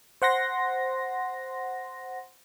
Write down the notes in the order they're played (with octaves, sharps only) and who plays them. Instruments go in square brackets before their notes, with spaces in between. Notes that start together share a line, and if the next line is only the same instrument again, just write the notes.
[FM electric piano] C5 F#5 C6 A#6